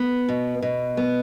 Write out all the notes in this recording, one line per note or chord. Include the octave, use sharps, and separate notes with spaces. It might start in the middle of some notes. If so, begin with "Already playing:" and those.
Already playing: B3
B2
B2
B3